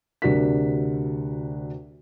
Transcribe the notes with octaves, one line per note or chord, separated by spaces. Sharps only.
D2 C3 D4 F#4 A#4 B6